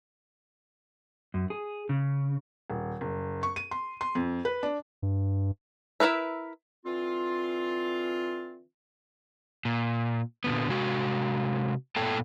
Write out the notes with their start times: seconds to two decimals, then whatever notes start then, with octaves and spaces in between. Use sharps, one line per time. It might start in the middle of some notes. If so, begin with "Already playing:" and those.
1.34 F#2
1.50 G#4
1.89 C#3
2.70 D#1
3.01 F#1
3.43 C#6
3.56 D#7
3.71 C6
4.01 C6
4.15 F2
4.45 B4
4.63 D4
5.02 G2
6.00 E4 F4 A#4 B4 E5
6.85 D3 E3 C4 F4
9.65 A#2
10.44 A#2 D3 B3
10.69 C3 G#3 F#4
11.96 A#2 A3 B3 A4 G5 A5